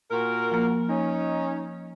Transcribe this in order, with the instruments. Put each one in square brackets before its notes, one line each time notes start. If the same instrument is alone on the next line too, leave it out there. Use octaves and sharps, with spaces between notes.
[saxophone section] A#2 F#4 A#4
[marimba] F3 A#3
[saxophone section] C#4 D#4